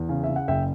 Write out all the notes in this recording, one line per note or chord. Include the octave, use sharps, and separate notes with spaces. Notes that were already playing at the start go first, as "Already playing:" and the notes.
Already playing: E2
C#3
E5
C#3
F#5
F#1 E5 G5